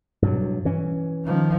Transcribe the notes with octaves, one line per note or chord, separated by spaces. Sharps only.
G2 B2 F#3
E3 C#4
D#3 F3